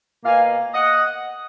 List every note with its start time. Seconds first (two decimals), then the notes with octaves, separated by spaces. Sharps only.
0.25 B2 A#3 F5 G#5
0.75 D#5 F#5